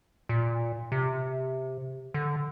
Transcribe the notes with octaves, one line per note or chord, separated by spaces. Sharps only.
A#2
C3
D3